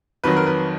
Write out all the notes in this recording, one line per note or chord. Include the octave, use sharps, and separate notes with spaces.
F2 D#3 F#3 B4
A#4
B4